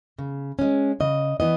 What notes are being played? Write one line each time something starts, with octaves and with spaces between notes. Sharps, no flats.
C#3
G#3 C#4
C#3 D#5
E3 B3 D#5